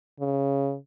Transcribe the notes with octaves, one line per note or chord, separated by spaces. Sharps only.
C#3